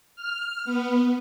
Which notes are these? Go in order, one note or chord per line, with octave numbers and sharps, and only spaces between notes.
F6
B3